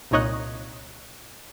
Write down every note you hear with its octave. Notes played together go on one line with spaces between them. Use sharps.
C2 A#2 D#4 C#5 D#5 F#6